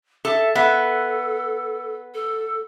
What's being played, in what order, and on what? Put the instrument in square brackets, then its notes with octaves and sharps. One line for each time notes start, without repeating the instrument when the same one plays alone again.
[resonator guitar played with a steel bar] A4 [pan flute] E5
[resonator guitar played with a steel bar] B3 E5 [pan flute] A4
[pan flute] A4